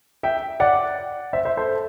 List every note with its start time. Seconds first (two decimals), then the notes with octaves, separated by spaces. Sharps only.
0.23 E5 G5
0.60 D5 F#5
1.33 C5 E5
1.45 C5 E5
1.57 A4 C5